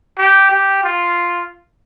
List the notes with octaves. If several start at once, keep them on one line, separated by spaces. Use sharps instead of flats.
G4
G4
F4